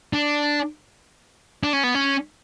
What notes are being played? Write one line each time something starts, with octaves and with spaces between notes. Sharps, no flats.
D4
D4
C#4
B3
C#4